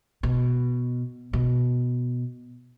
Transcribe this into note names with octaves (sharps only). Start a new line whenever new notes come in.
B2
B2